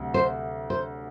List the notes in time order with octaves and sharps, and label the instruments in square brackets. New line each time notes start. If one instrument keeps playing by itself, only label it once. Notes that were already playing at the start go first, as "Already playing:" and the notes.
Already playing: [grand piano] D2 C3 F#3
[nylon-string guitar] C5
C5